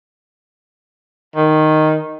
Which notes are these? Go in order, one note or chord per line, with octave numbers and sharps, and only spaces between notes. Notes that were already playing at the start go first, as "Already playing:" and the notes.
D#3